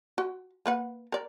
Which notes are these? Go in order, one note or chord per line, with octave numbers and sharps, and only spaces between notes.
F#4
A#3 B4 F#5
A#4 D5